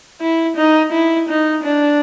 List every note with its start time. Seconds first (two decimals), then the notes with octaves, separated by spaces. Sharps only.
0.21 E4
0.57 D#4
0.92 E4
1.29 D#4
1.64 D4